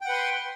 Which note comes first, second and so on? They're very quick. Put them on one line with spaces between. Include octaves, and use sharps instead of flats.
G5 F#5 B4 C6